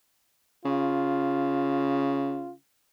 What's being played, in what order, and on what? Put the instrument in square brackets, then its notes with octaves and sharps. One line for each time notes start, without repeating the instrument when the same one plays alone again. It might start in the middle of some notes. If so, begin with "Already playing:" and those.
[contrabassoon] C#3 [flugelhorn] F4